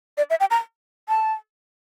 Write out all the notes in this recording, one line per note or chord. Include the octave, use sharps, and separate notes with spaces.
D5
E5
G5
A#5
A5